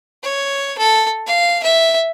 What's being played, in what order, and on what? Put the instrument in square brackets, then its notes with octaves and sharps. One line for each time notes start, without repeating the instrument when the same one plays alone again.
[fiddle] C#5
A4
F5
E5